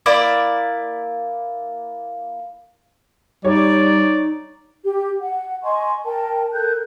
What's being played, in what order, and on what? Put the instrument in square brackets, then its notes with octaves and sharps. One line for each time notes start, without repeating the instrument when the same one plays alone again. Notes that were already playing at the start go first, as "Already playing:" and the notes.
[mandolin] A#3 E4 D5
[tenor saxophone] G3 [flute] D#4 [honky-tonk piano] C#5 [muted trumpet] D5
[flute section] G4
F#5
D#5 G#5 C6 C#6
A#4 G5 A5
A4 A#4 F#6 G6